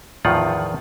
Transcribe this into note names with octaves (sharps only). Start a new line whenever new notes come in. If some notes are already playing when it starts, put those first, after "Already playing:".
E2 A2 D#3 F3 F4 F#5